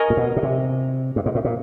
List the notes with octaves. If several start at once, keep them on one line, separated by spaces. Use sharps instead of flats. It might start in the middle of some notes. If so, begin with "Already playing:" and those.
Already playing: A#4 D#5 G#5 C#6
A#2
B2
B2
C3
G2
G#2
A2
A#2